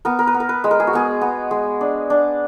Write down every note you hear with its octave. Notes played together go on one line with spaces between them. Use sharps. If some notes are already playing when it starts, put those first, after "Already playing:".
B3 A#4
A#4
B4
B3
A#4
B4
G#3
A#4
G#4
F#4
B3 G#4
B3
G#3
D4
D4